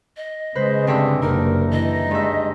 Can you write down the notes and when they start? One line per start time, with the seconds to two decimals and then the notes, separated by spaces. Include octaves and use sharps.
0.17 D#5
0.55 C#3 G#3 B4 C5
0.87 G2 D3 C4 E5
1.22 F#1 C3 D#4 A#4
1.72 E3 D#5
2.11 G2 G#3 E5